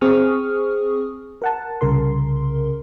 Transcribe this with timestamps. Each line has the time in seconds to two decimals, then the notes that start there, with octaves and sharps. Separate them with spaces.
0.01 C4 G#4 C#6 D#6 F6
1.42 A#4 F#5 A5
1.81 C2 C#3 A#4 C6